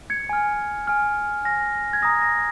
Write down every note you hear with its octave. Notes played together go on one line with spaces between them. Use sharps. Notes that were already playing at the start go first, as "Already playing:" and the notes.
G#6 C#7
G#5 F6
G#5 F6
G#5 F6 A#6
G#6
A#5 D#6 A#6
A#6